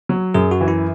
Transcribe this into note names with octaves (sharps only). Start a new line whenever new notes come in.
F#3
F#2 G#4
F#4
E3
E4